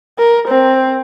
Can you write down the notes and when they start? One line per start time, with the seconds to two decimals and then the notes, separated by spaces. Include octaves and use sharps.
0.18 A#4
0.48 C4